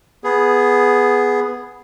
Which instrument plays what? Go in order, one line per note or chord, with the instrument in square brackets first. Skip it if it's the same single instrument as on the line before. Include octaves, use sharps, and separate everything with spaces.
[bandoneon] B3 G#4